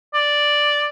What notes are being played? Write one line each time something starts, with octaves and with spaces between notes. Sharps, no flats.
D5